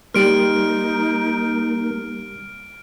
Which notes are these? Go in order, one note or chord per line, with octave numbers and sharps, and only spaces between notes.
G3 A#3 D#4 C6 F6 D7